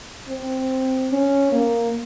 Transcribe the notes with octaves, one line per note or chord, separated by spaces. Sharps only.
C4
C#4
A#3